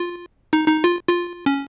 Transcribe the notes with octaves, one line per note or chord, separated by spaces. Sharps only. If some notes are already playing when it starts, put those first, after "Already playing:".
Already playing: F4
D#4
D#4
F4
F4
C#4